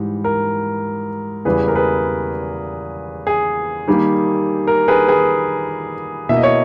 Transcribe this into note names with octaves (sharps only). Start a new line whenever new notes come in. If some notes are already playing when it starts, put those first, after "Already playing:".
Already playing: G#2 E3 G3
A#4
E2 C#3 E3 G3 G#4 B4
A#4
G#4 B4
G#4
D#3 G3 A#3
A#4
G#4 B4
G#4 B4
B2 A#3 E4 E5
D#5
C#5